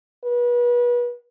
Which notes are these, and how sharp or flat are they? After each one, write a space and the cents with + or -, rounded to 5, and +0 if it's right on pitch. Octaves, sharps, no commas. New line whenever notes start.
B4 -35